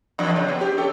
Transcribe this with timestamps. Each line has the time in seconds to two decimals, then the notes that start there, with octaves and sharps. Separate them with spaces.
0.19 E2 D4
0.36 C#3
0.48 B3
0.61 G4
0.77 C#4 A4